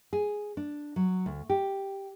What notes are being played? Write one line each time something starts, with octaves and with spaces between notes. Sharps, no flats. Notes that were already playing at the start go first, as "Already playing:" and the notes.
G#4
D4
F#3
D2
G4